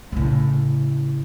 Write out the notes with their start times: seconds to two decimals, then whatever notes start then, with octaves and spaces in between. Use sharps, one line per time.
0.12 A2 C#3